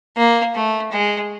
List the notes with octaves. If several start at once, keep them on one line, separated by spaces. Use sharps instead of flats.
A#3
A3
G#3